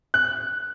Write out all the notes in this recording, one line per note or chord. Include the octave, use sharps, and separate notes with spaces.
F#6